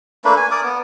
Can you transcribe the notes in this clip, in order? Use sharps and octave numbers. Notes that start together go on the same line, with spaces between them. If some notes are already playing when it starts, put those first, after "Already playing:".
A3 A#3 D4 B4
G#5
A#4 D5 D6 D#6
B3